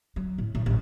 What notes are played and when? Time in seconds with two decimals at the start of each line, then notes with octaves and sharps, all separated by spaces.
0.16 F#3
0.38 A2
0.55 A2
0.66 A1